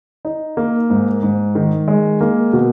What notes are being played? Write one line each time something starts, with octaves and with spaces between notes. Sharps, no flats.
D#4
A#3
G#2
G#2
D#3
G#3
A#3
B2